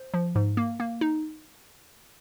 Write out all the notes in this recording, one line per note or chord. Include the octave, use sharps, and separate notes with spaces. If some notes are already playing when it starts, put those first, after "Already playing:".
Already playing: C5
F3
G#2
A#3
A#3
D#4